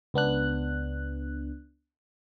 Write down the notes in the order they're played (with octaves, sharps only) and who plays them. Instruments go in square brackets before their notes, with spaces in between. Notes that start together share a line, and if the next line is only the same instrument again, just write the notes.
[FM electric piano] C#2 B3 D4 F#6